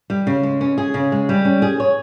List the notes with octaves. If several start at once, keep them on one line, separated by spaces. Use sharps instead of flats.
G3
C#3
G#3
C#4
G#4
C#3
G#3
G3
C#4
G#4
C#5